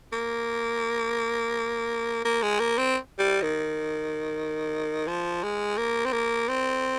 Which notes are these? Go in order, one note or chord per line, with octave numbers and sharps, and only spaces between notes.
A#3
A#3
G#3
A#3
C4
G3
D#3
F3
G#3
A#3
C4
A#3
C4